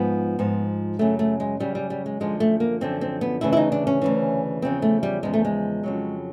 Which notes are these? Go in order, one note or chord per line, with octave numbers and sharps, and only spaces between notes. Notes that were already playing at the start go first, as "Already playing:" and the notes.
Already playing: G#2 F3 B3
G#2 F3
F#2 C#3 F#3 A3
A3
G#3
F#2 C#3 F#3 G3
G3
G3
G#3
F#2 D3 F3 G#3
A3
A#3
F#2 D3 F3 C4
C4
B3
D2 C#3 E3 E4
E4
D#4
D4
C#4
D2 C#3 E3
E2 C#3 F3 C4
A3
G3
E2 C#3 F3 G#3
A3
G#3
F2 C#3 F#3